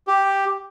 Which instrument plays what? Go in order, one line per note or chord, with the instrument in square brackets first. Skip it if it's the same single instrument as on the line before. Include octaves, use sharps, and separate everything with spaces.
[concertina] G4